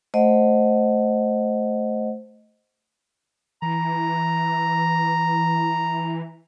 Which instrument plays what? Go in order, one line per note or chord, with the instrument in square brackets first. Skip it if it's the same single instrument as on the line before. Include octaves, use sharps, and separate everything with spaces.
[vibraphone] A3 C5 D#5 F#5
[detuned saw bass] E3 [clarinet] A#5